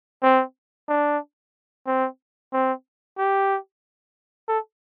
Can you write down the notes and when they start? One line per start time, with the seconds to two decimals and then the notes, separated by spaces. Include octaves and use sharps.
0.23 C4
0.89 D4
1.87 C4
2.53 C4
3.18 G4
4.48 A4